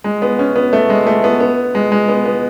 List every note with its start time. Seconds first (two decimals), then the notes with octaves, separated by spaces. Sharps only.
0.04 G#3
0.22 B3
0.39 C#4
0.56 B3
0.73 A3
0.90 G#3
1.07 A3
1.24 B3
1.40 B3
1.75 G#3
1.92 G#3
2.08 B3
2.25 B3